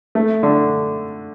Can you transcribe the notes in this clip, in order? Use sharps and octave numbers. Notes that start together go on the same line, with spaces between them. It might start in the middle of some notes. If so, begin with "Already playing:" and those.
A3
D3